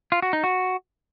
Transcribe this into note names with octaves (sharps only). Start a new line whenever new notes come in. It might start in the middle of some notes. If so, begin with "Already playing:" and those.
F4
F#4
D#4
F#4